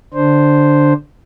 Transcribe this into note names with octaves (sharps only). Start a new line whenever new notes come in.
D3 D4 C5